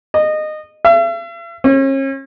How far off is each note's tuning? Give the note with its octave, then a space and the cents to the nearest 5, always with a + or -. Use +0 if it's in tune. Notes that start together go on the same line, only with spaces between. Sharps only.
D#5 -20
E5 +45
C#4 -40